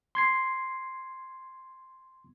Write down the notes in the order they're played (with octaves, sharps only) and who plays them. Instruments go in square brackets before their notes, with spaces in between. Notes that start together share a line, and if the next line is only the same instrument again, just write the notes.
[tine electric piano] C6 G#6 C7